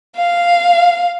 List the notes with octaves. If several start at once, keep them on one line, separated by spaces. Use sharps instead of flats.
F5